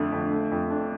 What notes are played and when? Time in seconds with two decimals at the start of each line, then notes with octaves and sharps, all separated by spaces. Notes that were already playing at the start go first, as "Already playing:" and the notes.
Already playing: F2 D3 A3 D4
0.12 F2
0.31 A3
0.51 F2
0.70 D4